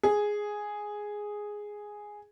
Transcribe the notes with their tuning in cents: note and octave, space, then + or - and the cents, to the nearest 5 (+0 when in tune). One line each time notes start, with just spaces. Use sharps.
G#4 +0